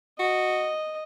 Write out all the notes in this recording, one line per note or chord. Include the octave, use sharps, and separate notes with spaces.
F#4 D#5